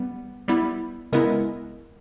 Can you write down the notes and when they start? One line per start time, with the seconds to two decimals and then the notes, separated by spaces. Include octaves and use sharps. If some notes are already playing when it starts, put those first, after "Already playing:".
Already playing: G3 B3
0.48 G3 B3 E4
1.12 C#3 G#3 B3 E4 A#4